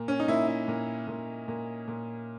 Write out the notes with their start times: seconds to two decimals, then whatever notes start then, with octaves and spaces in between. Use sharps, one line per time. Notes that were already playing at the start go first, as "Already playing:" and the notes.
Already playing: A#2
0.08 C#4
0.20 D#4
0.28 A#2 E4
0.47 E4
0.68 A#2
1.08 A#2
1.48 A#2
1.88 A#2